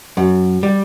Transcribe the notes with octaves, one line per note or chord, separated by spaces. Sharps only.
F#2
G3